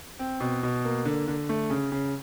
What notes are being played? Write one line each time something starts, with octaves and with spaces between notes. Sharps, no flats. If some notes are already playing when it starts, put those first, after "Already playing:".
C4
B2
B2
A#3
D3
D3
A3
C#3
C#3